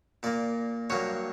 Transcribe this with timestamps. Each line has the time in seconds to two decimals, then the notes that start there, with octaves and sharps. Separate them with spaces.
0.23 A#2 A#3 D5
0.90 G2 F#3 A#3 C#5